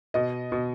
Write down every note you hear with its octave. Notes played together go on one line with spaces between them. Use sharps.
B2 D#5
B2